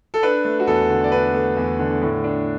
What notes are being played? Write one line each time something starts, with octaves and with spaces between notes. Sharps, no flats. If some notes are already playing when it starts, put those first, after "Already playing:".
A4
D4 B4
A3
F#4
E2 A4
D3
D5
D4 B4
A3
E2
D3
A2
D4